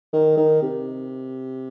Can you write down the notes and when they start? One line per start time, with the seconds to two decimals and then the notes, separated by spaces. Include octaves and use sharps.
0.13 D#3
0.37 D#3
0.62 C3